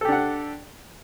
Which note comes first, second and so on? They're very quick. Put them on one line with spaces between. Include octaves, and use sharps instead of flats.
A4 G4 D4 F#5